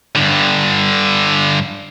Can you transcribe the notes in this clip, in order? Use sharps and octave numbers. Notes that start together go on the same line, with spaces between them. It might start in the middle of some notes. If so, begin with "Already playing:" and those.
G2 D3